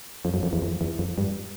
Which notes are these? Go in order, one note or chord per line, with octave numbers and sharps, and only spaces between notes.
F2
F#2
F2
E2
F2
E2
F2
G2